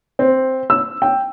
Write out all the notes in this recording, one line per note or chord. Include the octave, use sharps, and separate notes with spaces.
C4
E6
G5